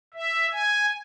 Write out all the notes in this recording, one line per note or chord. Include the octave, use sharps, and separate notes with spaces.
E5
G#5